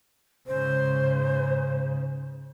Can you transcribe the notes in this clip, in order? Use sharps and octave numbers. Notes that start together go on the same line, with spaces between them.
G#2 C#3 C5